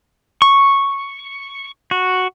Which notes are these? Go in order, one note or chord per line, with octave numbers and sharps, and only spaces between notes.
C#6
F#4